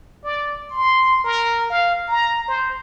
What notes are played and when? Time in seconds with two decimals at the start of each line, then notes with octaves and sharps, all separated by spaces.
0.24 D5
0.71 C6
1.24 A#4
1.70 F5
2.08 A#5
2.48 C5